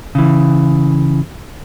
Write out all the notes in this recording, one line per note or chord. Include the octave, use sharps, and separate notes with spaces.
C#3 E3